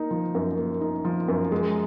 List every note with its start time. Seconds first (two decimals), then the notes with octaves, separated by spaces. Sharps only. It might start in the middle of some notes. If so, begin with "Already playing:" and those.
Already playing: A#3 D#4
0.11 F3
0.35 F#2
0.57 A#3
0.81 D#4
1.05 F3
1.28 F#2
1.52 G#3